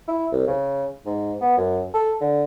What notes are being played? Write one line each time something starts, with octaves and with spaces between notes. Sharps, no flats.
E4
C2
C#3
G#2
B3
F#2
A4
D3